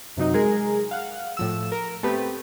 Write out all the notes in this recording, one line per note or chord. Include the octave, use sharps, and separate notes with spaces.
F#2 C3 F#3 D#4
G#3 G#4 A#4
F5 F#5
A2 F3 E6
A#4
A3 B3 C4 G4 B4